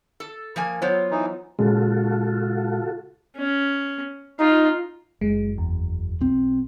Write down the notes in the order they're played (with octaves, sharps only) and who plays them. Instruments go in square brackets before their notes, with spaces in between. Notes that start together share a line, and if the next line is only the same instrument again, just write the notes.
[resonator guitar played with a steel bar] A4
F3 A#3 G#5
[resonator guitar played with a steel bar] F#3 B3 F4 [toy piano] C5 C#5
[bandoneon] E3 D#4
[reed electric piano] A#2 C#3 G#3 [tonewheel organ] F4 F#4 A4
[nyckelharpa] C#4
[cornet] D#4 [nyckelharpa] F4
[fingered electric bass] F#1 [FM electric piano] G#3
[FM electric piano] E2
[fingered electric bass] B1 C4